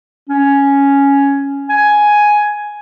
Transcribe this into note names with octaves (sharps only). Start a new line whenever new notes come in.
C#4
G#5